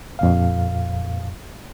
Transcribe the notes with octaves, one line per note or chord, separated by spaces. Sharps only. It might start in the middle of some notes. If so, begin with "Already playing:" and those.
F2 A#2 F5